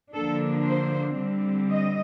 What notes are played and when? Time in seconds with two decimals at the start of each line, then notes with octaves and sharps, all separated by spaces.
0.13 D3 F3 A#3 D4 A4
0.66 C5
1.18 D3 G3 C4
1.71 D#5